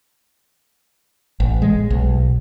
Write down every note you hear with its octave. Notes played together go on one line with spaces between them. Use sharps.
A1
G#3
B1